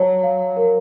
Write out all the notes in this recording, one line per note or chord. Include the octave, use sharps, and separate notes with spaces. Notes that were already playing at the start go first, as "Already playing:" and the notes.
Already playing: F#3 C#5 A5
F5
A#4